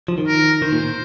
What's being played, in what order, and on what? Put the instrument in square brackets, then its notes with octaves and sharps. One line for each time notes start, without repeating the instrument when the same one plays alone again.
[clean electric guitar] F3
D#3
[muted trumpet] A#4
[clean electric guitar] D#3 [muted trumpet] C5
[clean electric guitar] A#2